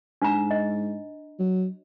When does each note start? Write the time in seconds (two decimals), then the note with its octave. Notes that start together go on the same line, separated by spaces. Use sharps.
0.22 G#2 D4 A#5
0.51 D#5
1.39 F#3